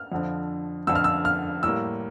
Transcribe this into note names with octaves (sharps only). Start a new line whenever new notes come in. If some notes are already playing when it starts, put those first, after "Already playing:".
Already playing: F6
F2 D3 F3
F2 D3 F3 E6
F6
E6
F6
A2 G3 A#3 E6